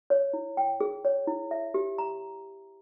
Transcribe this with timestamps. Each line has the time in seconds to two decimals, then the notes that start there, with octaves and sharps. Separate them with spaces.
0.10 C#5
0.33 E4
0.57 G5
0.81 G#4
1.05 C#5
1.27 E4
1.51 E5
1.74 G4
1.98 A#5